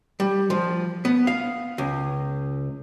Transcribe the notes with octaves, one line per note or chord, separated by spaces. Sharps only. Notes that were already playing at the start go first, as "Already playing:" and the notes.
G3
F3
B3
F5
C#2